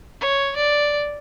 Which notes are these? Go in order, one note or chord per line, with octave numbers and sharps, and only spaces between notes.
C#5
D5